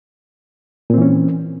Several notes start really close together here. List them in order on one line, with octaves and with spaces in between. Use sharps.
A#2 C4 E3 C#4